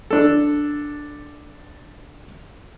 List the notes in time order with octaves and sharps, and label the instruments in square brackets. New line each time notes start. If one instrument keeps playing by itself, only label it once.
[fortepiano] D4 A4